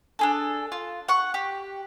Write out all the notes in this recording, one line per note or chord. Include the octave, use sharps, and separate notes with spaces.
D4 G#4 A4
F4
F#5 C#6
G4